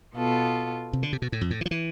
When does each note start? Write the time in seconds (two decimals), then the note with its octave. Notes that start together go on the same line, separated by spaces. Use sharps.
0.16 B2 B3 F4 A4
0.93 C3
1.03 D3
1.13 C3
1.22 B2
1.32 A2
1.41 F2
1.51 A2
1.61 E3
1.66 F3
1.71 E3